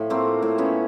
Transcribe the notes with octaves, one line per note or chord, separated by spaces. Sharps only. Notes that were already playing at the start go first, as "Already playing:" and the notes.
Already playing: A2 F3
A3 A#3 C4
A2
B3 C#4